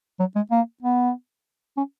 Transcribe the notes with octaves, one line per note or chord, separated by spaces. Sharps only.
F#3
G#3
A#3
B3
C#4